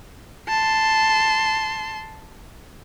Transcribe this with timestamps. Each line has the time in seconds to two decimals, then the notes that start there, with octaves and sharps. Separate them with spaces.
0.49 A5 C6